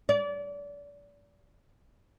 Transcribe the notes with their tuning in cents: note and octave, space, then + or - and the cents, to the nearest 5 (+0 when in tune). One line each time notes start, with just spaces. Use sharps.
D5 -30